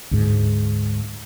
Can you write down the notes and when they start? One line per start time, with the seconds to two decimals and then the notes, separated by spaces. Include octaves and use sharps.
0.11 D2 G#2